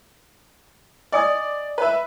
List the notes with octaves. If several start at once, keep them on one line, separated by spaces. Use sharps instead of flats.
D5 D#5 G#5 D#6
B4 E5